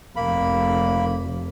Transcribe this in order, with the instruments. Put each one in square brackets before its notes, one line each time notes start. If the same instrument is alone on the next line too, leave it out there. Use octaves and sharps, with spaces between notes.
[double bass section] F1 [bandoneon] A#3 B5